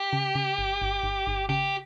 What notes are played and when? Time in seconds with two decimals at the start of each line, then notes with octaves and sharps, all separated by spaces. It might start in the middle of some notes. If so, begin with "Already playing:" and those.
Already playing: G4
0.13 C#3
0.35 C#3
0.58 G1
0.82 G1
1.03 G1
1.27 G1
1.49 C#3 G4